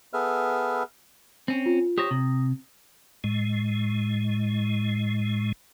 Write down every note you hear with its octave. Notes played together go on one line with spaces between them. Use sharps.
B3 G#4 A4 B4 E5 F6
C4 C#4
F4
G4 C5 C#5 D#6 A#6
C3
A2 G#3